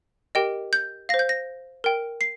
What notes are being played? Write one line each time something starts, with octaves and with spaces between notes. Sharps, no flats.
G4 A#4 D#5 G5
G6
C5 F5 A#6
G6
A#6
A#4 G5
C7